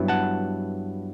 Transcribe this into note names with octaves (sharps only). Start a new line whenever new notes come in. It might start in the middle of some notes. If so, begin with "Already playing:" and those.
Already playing: G2 F#3 B3 E4
F#5 A5